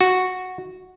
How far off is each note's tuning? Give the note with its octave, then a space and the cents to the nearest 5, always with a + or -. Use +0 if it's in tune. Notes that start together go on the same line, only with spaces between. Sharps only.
F#4 -5